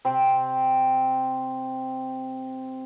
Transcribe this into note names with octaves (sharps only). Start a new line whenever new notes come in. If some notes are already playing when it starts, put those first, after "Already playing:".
C3 C4